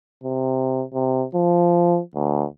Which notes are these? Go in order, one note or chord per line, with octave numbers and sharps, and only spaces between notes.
C3
C3
F3
D2